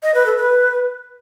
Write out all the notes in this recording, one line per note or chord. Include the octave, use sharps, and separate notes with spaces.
D#5
B4
A4
B4